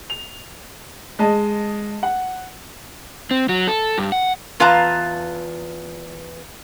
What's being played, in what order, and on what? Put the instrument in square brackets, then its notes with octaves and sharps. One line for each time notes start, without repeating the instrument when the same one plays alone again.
[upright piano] F7
G#3 D#5 A5
F#5
[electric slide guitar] C4
F#3
A4
G2
F#5
[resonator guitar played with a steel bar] E2 F4 B4 F5 A5 A#5